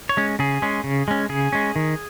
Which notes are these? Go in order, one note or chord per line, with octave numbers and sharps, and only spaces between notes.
C#5
G#3 C#4
C#3 G#4
G#3 C#4
C#3
G#3 C#4
C#3 G#4
G#3 C#4
D#3